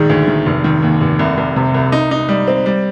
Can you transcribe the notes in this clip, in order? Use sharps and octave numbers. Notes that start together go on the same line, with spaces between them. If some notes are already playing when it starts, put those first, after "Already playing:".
Already playing: A#1 D#3 G#3
D2
D#3
F1
D#3
D#2
F1
C2
C2
C3
C2
D#4
D#4
G3
C4
G3